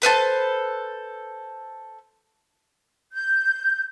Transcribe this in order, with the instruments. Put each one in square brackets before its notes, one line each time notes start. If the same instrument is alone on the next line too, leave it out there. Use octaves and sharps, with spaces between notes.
[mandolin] A4 B4 C5 A5
[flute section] G6